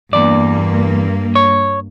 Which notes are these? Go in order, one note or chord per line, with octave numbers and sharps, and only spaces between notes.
E2 G2 A#3 D5
C#5